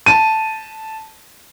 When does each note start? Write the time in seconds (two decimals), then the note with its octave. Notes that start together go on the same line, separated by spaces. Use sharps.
0.06 A5 D#7